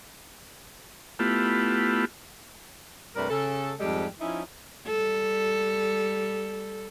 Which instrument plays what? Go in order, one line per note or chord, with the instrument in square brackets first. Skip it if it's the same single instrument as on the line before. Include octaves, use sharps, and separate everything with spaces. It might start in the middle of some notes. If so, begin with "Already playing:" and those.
[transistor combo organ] A3 B3 E4 F4 G4
[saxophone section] G2 C3 A3 A#4 B4 D5
C#3 A4
F2 G#2 G3 G#3 G4 A4
F3 C#4 D#4 E4
[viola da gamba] G3 A4